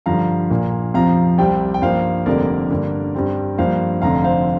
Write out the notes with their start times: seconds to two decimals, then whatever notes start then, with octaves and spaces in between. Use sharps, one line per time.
0.06 G2 D3 F3 F5 A#5
0.50 A#1 A#2 A#3
0.94 F2 C3 F3 F5 A#5
1.38 C2 C3 G3 C4 D5 G5
1.74 G5
1.82 G2 F3 A#3 C5 F5
2.26 F1 F2 D3 G3 A#3 A#4 D5
2.70 G2 D3 A#3
3.15 G2 G3 C4
3.58 G2 F3 A#3 C5 F5
4.02 F1 F2 D3 F5 A#5
4.24 C5 F5